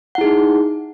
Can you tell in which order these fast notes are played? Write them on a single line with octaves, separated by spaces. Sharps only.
F#5 E4 G#4 D#4